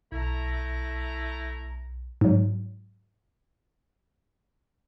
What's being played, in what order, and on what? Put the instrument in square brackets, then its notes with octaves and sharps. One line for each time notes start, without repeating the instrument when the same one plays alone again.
[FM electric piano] B1 [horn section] A3 E4 A#5
[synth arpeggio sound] G#2 F#3